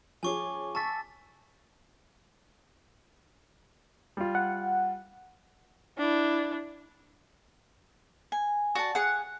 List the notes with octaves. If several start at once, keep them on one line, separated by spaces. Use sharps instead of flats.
F3 C#4 G#4 G#5 C#6 D6
A5 C#6 E6 A6 B6
G3 F4
F#5
D4 E4
G#5
F#4 D5 A5
G#4 F5 F#5